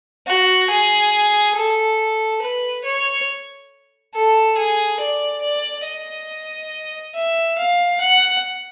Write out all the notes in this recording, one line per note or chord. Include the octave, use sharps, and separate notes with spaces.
F#4
G#4
A4
B4
C#5
A4
G#4
D5
D5
D#5
E5
F5
F#5